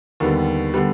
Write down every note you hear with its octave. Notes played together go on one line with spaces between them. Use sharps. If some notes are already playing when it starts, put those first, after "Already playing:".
D#2 D3 G3 B3
D3 G3 B3